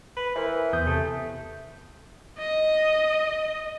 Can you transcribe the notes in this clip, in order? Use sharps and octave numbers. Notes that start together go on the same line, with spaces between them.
B4
E3 A#4 C5 E5
E2 D#6 G6
C3 A3
D#5